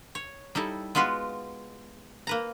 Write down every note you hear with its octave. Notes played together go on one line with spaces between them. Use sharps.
C#5
G3 D#4 E4 A4
G#3 B3 F4 F#4 B4
A#3 B4 A#5